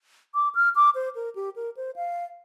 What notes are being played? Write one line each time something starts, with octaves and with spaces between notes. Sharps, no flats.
D6
F6
D6
C5
A#4
G4
A#4
C5
F5